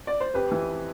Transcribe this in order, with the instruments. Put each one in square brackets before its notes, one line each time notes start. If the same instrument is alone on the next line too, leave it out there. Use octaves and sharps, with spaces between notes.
[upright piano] D5
C5
F2 G4 B4
E3